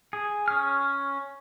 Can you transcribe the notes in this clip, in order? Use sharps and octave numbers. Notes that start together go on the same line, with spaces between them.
G#4
C#4 F6